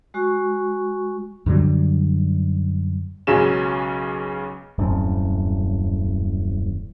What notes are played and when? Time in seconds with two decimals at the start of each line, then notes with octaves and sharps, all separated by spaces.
0.14 G#3 F#4 C#6
1.46 F#2 D3 F#3 G3
3.27 B1 C#3 F#3 G#3 C#4 E7
4.78 D#1 F#2 A2 C4